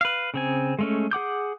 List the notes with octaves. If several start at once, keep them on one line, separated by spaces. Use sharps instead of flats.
B4 F5
C#3 C4 G#5
G#3 A3 C#4
G#4 F#5 D6 G6